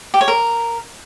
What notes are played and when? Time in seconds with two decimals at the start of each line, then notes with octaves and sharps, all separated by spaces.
0.14 G4
0.21 C#5
0.28 A#4